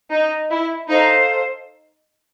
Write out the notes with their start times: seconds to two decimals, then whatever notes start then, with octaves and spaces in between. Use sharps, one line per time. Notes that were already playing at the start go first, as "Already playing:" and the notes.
0.12 D#4
0.50 E4
0.88 D#4 A4 C5 F5